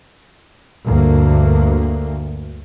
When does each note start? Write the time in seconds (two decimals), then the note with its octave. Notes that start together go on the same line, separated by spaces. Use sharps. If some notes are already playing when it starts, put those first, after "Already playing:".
0.84 D2 G2 A#3